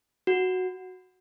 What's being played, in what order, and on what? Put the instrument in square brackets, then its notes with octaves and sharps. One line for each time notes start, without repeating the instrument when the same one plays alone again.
[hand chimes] F#4